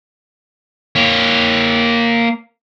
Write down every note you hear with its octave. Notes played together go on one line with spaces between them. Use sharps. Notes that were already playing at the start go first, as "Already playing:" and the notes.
A#3 C#5